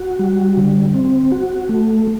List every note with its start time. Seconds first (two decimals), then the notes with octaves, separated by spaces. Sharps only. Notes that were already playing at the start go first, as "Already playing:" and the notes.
Already playing: F#4
0.19 G3
0.57 D3
0.94 C4
1.32 F#4
1.69 A3